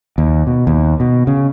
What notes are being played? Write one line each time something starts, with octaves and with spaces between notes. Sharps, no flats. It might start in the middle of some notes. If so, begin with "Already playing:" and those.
D#2
B2
D#2
B2
C#3